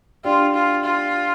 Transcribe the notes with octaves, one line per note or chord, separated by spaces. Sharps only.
D4 F4 G4 D5 G5
F4
F4